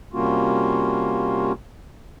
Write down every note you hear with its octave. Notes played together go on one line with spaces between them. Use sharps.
C3 G3 A#3 C#4 F4 F#4